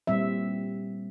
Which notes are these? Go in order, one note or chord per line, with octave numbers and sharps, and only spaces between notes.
A#2 G3 C4 E5